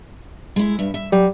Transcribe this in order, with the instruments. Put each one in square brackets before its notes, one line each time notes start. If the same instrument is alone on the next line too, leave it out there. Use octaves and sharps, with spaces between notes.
[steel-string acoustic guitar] G#3 E4
G2 E5
E5
[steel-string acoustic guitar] F#3 [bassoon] G3